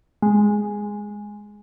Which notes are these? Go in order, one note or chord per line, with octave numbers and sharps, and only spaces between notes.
G#3